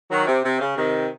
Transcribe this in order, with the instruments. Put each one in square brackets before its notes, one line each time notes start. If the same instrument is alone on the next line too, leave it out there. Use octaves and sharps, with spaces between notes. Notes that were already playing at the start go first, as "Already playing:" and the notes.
[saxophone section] D#3 F#3
C3
C3
C#3
C3 D#3